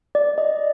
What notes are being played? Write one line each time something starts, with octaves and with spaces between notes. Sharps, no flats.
D5
D#5